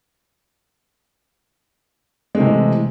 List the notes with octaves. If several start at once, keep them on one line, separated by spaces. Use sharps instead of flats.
C3 E3 G#3 A3